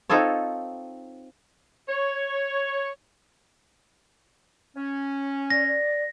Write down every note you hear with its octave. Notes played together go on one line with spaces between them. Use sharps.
C4 D#4 F4 A4 C#5
C#5
C#4
D5 A#6
D5